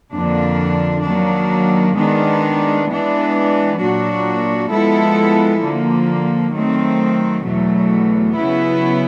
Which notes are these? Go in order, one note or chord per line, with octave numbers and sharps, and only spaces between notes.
F2 D3 F3 A#3 D4
D#3 F#3 A#3 D4
D#3 G#3 B3 D4
E3 G#3 B3 D4
A#2 F#3 A#3 D4 F#4
F3 G#3 B3 E4 A4
D3 F3 A#3
D#3 F#3 A3 C4
E2 B2 F#3 A3
C#3 F#3 B3 E4